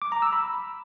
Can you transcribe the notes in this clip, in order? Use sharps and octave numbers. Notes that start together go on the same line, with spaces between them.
D6
A#5
E6
B5